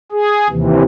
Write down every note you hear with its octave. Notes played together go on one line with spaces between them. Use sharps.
G#4
D#2 C3 E3